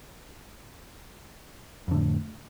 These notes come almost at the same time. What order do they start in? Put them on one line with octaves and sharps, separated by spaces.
F2 D3 A2